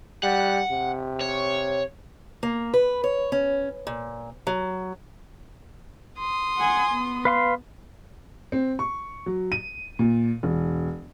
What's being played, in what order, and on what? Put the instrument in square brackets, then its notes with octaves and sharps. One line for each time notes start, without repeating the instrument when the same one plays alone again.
[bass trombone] G3 [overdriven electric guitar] F#5
[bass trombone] C3
[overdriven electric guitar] C#5
[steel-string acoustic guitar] A#3
B4
C#5
C#4
A#2
F#3
[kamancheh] C6 D#6
[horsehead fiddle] F#5 G#5
B3
[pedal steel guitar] B4 F5 C6
[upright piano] C4
C#6
F#3
D#7
A#2
E1